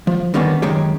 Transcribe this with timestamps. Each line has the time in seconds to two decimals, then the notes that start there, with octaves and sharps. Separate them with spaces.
0.07 F3
0.34 D3 D#3 G3 A#3 B3 C#4
0.62 C#2 F#2 D#3 G#3 G4 C#5